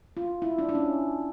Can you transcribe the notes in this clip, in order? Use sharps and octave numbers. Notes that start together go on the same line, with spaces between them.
F4
E4
D4
D4
C#4